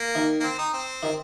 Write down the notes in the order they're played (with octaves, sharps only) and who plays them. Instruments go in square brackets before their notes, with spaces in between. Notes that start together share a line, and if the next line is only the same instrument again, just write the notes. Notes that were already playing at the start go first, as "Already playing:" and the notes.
Already playing: [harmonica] A#3
[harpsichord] D#3
[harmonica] A#3
C4
D#4
C4
[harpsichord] D#3